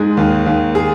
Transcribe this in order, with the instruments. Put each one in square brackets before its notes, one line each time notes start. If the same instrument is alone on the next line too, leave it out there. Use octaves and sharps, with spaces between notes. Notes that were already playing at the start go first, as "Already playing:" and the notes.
Already playing: [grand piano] G#2 G#3
D#2
D#2
G#4